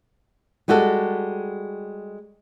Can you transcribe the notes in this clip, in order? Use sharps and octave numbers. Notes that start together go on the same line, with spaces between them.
G3 G#3 F#4 G4 A4